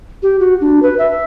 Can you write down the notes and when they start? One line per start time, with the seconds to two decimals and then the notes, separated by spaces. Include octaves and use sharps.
0.23 G4
0.40 F#4
0.61 D4
0.82 B4
0.98 E5